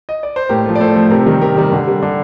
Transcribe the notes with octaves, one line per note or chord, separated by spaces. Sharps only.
D#5
D5
C5
A2 G4 A#4
F3 A3
D5
A2 A4 C5
F3 A3
C3 G4 A#4
D#3 G3
C3 G4 A#4
D#3 G3
D3
G3
D3